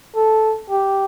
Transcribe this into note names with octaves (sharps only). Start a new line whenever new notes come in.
A4
G4